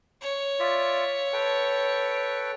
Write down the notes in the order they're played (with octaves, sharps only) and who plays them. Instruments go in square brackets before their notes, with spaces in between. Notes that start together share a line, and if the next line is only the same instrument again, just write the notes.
[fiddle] C#5
[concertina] F4 D5 E5
A4 B4 G5